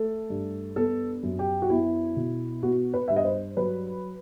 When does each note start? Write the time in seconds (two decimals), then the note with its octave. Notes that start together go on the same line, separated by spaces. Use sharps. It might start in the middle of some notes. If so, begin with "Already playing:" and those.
Already playing: A3 A4
0.30 G2
0.76 B3 A4
1.23 F#2
1.39 G4
1.62 F#4
1.70 B3 E4
2.17 B2
2.63 B3 F#4
2.94 B4
3.08 G2 E5
3.16 D#5
3.25 C5
3.57 F#3 B4